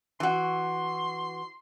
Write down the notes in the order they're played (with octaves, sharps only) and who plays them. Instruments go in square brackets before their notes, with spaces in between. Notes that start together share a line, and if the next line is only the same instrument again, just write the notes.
[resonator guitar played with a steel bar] E3 F#4 [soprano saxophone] C6